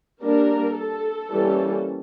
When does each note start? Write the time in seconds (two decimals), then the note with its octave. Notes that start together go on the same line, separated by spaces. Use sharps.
0.23 G3 A#3 D4 A#4
0.77 A4
1.32 E3 G3 A#3 C#4